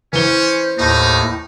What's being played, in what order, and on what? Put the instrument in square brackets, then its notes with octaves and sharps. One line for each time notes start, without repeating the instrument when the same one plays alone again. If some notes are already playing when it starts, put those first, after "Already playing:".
[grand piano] E3 G7 [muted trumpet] C#4 [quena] C5
[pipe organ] D#2 A2 [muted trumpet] D#4